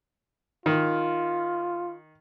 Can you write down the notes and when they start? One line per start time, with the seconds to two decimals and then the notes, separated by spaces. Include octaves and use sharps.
0.66 D#3 F4